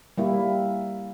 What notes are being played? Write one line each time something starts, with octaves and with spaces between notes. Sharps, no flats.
G3 A#3 E4